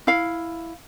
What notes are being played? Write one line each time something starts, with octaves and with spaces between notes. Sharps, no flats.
E4 F5